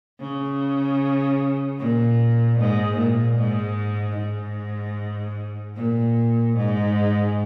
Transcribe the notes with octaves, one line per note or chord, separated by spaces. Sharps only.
C#3
A#2
G#2
A#2
G#2
G#2
A#2
G#2